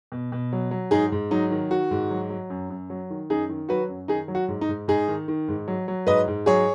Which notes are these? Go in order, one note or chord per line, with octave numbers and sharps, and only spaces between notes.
B2
B2
F#3
F#3
G#2 D#4 G#4
G#2
F#3 D#4
D#3
D#3 F#4
G#2
F#3
F#3
F#2
F#2
F#3
D#3
F#2 D#4 G#4
D#3
F#3 F#4 B4
F#2
D#3 D#4 G#4
F#3
F#4
G#2
D#4
G#2
G#2 D#4 G#4
D#3
D#3
G#2
F#3
F#3
G#2 B4 D#5
G#2
F#3 G#4 C#5